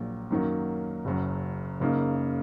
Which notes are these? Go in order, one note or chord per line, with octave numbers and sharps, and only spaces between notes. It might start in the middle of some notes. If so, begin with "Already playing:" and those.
Already playing: A#1 A#2 F#3
F#2 D#3 F#3 A#3
F#1 F#2 F#3
F#1 F#2 C#3 A#3 D#4